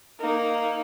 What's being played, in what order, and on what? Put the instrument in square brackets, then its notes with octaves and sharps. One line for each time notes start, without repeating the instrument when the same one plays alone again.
[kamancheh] A#3 D#4